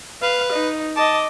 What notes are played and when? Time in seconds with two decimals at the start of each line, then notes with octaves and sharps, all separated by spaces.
0.22 B4 F5
0.53 D#4
0.97 D#5 A5 D6